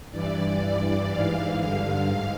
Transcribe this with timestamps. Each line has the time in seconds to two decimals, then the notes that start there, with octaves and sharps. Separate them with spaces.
0.11 G2 E3 D5
0.61 G2 E3
1.08 G#2 E3 F5
1.58 G2 D3
2.07 G#2